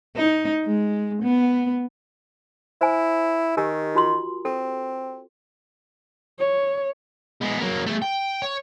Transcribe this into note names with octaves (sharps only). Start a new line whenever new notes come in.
D#4
G#3
B3
E4 C5 G#5
D#3 G4 A#4 G#5
F4 F#4 C6
C4 A4
C#5
G#3 B3
F#3 A#3
A3 G#4
G5
C#5